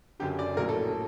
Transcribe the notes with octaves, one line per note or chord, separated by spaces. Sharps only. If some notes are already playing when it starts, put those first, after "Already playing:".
F#1 F#2 D3 G4
D5
A#1 A2 F#3 A#3 A#4
A4